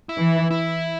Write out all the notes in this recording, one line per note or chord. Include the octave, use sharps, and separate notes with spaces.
E4
E3
E4